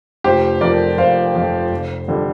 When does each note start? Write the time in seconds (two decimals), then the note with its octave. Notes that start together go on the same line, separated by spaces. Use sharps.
0.24 F1 G4 C5
0.61 F2 F3 A#4 D5
0.98 F1 C5 F5
1.34 F2 F3
1.71 F1
2.08 F2 D3 G3